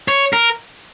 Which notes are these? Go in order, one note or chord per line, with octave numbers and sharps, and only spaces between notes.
C#5
A#4